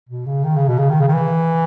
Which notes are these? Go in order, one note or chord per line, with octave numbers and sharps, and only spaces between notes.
B2
C#3
D#3
C#3
B2
C#3
D#3
C#3
D#3
E3